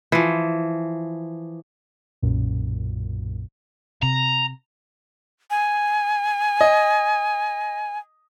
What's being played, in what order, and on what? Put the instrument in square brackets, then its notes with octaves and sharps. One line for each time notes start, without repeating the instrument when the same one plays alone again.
[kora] E3 F3
[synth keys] B1 F#2 A#2
[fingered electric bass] C3 [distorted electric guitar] A#5
[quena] G#5
[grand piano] D#5